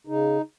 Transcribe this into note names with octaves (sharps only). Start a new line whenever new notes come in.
C#3 D#4